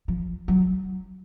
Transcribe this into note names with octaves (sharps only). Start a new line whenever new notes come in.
F3
F#3